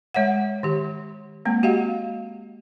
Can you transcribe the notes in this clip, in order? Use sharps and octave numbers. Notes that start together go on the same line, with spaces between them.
G#3 C#5 E5 F#5
D#3 G4
G#3 A#3 C4
F#4 G4 D#5 F5 F#5